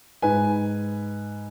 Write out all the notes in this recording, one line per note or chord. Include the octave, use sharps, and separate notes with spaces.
G#2 B4 G#5